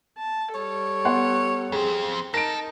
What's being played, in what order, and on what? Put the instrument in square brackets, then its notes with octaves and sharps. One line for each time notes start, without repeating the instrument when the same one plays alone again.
[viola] A5
[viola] G3 A4 [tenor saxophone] C#5
[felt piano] B3 F#5 C6
[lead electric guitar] F2 C4 [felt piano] G#4
[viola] D#4 [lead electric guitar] A4 [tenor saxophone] A#4 [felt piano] A#6 D7